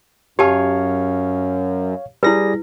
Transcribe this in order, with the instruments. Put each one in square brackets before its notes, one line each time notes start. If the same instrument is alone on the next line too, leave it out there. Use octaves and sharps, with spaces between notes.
[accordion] F#2 [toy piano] G4 G#5 A5 [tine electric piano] C#5 F5
[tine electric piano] G3 G#4 A#6 [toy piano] E4 B4